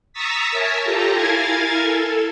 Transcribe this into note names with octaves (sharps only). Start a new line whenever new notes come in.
A#5 C#6 D#6 E6 A6 B6
A#4 C#5 E5 G#5 A5
F4 G4 A4 A5 A#5
E4 A#4 F5 G#5 G#6 A6
A4